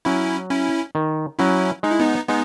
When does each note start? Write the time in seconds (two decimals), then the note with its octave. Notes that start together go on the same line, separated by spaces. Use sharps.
0.05 F#3 C#4 E4
0.50 C#4 E4
0.95 D#3
1.39 F#3 C#4 E4
1.83 G#3 D#4
1.92 E4
2.00 B3 D#4
2.28 G#3 B3 D#4